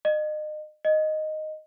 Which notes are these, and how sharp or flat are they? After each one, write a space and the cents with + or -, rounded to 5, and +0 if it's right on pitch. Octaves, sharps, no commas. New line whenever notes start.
D#5 -35
D#5 -5